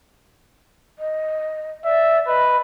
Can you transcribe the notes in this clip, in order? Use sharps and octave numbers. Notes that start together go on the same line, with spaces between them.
D#5
D5 E5
B4 D#5